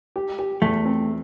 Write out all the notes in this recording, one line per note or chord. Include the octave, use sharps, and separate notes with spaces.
G4
G4
E2 A3
C4